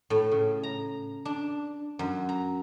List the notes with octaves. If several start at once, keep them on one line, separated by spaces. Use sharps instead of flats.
A2
C#3
A#5
D4
F#2
A#5